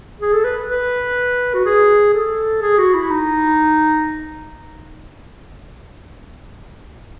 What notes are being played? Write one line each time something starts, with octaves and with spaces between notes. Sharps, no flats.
G#4
A4
B4
B4
F#4
G#4
A4
G#4
F#4
E4
D#4